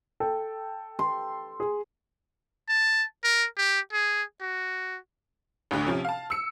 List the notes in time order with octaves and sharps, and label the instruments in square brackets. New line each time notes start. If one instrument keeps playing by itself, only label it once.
[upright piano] A4 G5
[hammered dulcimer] C6
[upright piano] G#4
[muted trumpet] A5
A#4
G4
G#4
F#4
[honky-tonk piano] A1 D2 D3
C3 F3 C#4
F5 A5
E6 C#7